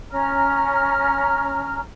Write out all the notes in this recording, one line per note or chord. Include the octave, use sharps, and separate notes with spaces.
C#4 A#5 F6